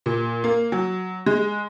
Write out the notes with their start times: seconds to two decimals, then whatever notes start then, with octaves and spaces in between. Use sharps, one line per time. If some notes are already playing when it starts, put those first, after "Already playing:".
0.06 A#2
0.44 A#3
0.72 F#3
1.26 G#3